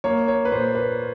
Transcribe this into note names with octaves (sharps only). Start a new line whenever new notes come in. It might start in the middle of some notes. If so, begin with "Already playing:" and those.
A#3 C#5
C#5
B4
A#2 C5
B4